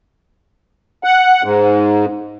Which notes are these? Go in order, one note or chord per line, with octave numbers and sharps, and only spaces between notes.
F#5
G#2